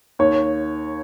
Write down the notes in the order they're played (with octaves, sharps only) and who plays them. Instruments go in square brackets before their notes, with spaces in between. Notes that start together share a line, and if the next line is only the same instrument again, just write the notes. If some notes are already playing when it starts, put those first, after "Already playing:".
[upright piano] D#2 C#5